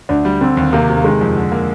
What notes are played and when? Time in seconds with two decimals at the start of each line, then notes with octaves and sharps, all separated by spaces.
0.09 D2 D4
0.25 G3
0.41 D3 C4
0.57 D#2
0.73 C3 A#3
0.89 C3
0.97 A#3
1.04 D#3 G#3
1.21 F2
1.36 D3
1.52 A#3